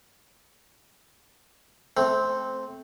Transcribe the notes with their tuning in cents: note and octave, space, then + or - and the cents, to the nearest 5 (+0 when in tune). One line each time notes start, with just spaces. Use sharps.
A3 -25 C4 +0